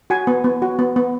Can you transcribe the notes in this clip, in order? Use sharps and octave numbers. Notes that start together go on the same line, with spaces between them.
F#4 G#5
B3
B3
F#4
B3
B3